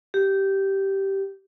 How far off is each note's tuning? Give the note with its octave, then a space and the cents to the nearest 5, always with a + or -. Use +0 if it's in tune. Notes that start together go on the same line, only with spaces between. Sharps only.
G4 -10